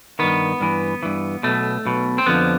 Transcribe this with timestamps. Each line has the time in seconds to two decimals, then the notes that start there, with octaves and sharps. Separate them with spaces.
0.19 G2 D#3 B3
0.61 G2 E3
1.03 G2 E3
1.43 B1 B2 A3
1.85 B1 B2
2.18 C4
2.26 F2 D3 F3 B3